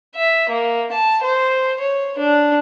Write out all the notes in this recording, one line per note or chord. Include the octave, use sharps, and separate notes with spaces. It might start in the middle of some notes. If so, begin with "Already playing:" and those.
E5
A#3
A5
C5
C#5
D4